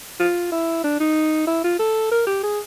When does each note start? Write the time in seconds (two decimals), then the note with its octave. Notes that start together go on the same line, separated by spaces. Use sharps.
0.20 F4
0.52 E4
0.84 D4
1.00 D#4
1.47 E4
1.64 F4
1.79 A4
2.11 A#4
2.27 G4
2.43 G#4